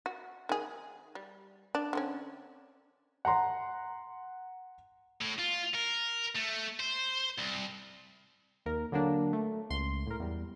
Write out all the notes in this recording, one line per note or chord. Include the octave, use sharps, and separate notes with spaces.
F#4
D#3 G#4
G3
D4
D3 C4 C#4
F#5 A#5 C6
A2
F4
A#4
A3
C5
C2
D#2 A#4
D3 F#3 A#3 D4
A3
C#2 C6
A2 A#4
E2 G3